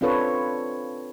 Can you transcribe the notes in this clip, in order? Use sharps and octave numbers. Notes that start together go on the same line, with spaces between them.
C4 D4 F4 A4 B4 C#5